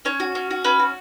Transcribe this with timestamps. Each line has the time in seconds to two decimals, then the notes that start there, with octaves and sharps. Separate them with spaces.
0.05 C#4 C#5
0.20 F#4
0.35 C#4
0.51 F#4
0.65 C#4 B4
0.80 F#4